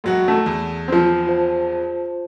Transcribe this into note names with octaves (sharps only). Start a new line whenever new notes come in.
E1 F#3 F#4
A3
E2
F3 C4
F4 C5 A5